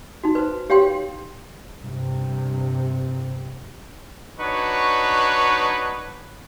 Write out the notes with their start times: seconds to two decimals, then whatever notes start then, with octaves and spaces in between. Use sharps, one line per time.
0.24 D#4 F#4
0.35 B4 C5
0.70 G4 C#5 F5 G5 C6
1.81 G2 C3
4.40 D4 D#4 F#4 B4 C#5 C#6